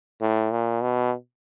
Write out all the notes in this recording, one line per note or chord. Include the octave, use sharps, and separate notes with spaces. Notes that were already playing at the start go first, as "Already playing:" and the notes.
A2
A#2
B2